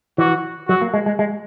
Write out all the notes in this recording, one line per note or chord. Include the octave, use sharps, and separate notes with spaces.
E3 F#4
F#3 F#4
A#3
G#3
G#3
G#3